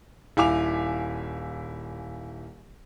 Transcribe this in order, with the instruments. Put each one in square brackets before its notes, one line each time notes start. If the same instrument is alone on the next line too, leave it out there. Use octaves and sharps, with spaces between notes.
[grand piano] D#1 E4 F5 G#5 D6 F7